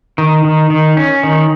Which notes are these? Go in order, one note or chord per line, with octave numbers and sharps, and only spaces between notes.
D#3
D#3
D#3
C#4
D#3